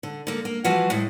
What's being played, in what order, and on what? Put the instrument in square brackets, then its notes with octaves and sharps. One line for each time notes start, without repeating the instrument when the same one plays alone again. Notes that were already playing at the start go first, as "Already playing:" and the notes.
[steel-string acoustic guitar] D3
D3 A#3
A#3
E3 F3 G3 F#4 F5 G#5
A2 G#3